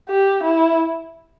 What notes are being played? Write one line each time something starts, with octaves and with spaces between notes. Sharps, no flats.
G4
E4